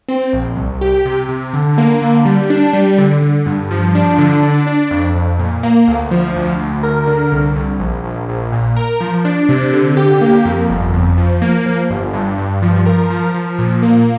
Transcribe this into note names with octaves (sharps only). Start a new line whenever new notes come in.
C4
A#1
C2
G4
C3
C3
D3
A#3
D3
G3
D4
G3
D3
D3
G2
F3
D4
D3
D4
D4
F2
F2
A#2
A#3
D2
F3
D2
D2
A#4
D3
C2
C2
A#1
A#1
A#1
A#2
A#4
F3
D4
C3
D3
G4
A#3
F2
G1
F2
F3
A#3
F3
G1
G2
G2
F3
A#4
F3
F3
A#2
A#3